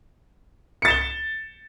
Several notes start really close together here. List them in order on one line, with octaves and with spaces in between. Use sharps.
C#7 A6 E7 G7